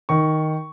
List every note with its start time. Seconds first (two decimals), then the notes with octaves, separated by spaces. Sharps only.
0.09 D#3 C#6